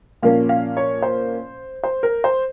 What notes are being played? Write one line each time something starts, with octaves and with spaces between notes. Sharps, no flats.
A#2 F3 A#3 C#4 F5
F5
C#5
C5
C5
A#4
C5